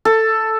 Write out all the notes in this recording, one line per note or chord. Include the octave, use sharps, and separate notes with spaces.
A4